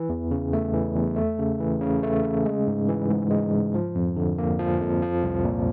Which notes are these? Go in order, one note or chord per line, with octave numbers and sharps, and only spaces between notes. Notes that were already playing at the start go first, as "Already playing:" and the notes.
Already playing: E3
E2
C#3
A3
E3
E2
A3
C#3
E3
C#3
A3
C#3
G#3
G#2
E3
G#2
G#3
G#2
F3
F2
D3
A#3
F3
F2
F3
C2
A#2